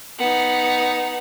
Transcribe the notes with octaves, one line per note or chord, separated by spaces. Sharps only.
B3 D#4